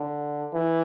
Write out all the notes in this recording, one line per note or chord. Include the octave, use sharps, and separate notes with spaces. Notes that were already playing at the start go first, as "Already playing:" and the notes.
Already playing: D3
E3